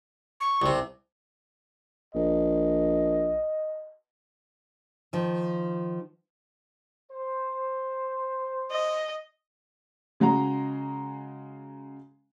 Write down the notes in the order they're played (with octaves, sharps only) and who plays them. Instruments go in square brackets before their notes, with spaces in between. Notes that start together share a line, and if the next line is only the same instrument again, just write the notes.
[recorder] C#6
[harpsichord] C2 C3
[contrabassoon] A#1 [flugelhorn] D#5
[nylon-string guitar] D#3 F3
[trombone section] C5
[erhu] D#5
[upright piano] C#3 G#3 F#4 A#5